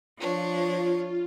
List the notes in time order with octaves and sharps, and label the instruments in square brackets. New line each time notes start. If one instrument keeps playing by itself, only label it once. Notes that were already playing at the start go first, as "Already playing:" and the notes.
[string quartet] F3 D4 C#5 [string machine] F4